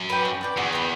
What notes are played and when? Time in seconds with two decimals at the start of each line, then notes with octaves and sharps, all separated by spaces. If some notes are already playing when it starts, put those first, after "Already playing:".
Already playing: F#2
0.10 B4 D5 G5
0.25 F#4
0.41 B4 D5 G5
0.57 E2 F#4
0.73 B4 D5 G5